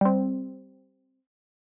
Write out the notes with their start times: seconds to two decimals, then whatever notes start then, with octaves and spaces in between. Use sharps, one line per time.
0.01 G3 C4